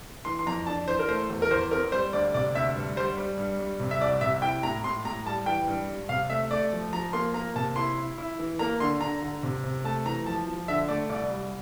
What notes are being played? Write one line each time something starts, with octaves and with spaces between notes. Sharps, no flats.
E3 C6
C6
F2 A#5
D4 A5
E3 C5
A#4
A3 C5
E2
A#4
E2 C5
C4 A#4
G3 C5
D2 D5
C3 D5
D2 E5
G2
G3 C5
G3
G2
G3
C3
E5
C2 D5
C3 E5
E4 G5
A2 A#5
A2 C6
A2 A#5
G3 A5
E3 G5
G2
G3
C3 F5
A3 E5
A3 D5
F3
F3 A#5
A#3 C6
A#3 A#5
C3 A5
E4 C6
E4
E4
E3
A#3 A#5
D3 C6
D3 A#5
D3
C3
C3
A3 A5
E3 A#5
F3 A5
F3
D3 E5
A3 D5
C2 D5
G3